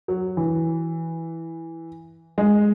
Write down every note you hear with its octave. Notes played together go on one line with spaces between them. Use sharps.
F#3
E3
G#3